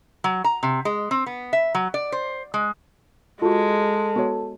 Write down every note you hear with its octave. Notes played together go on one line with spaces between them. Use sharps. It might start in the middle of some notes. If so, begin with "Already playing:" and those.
F#3
A#5
C3
G#3
C4
B3
E5
F#3
D5
C5
G#3
G#3 F4 F#4 A4
B3 F#4 C#5